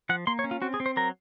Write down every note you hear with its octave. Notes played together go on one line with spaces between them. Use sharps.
F3 F#5
A#3 C6
C#5
C#4
F4
C4 F#4
G#4
C4
C5
F#3 A#4